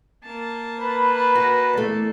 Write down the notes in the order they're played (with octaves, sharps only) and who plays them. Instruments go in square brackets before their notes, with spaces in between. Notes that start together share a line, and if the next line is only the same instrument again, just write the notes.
[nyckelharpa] A#3 A5
[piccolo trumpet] B4 [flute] B5
[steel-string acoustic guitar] F#4 [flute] A#6
[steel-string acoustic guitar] E2 A3 [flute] D5